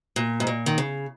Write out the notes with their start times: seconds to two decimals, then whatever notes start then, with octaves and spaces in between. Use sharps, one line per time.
0.16 A#2
0.40 G#2
0.47 A#2
0.66 D#3
0.78 C#3